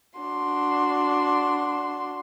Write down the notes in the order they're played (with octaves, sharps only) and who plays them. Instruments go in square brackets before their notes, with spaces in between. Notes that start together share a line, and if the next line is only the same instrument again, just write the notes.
[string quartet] D4 F#4 C6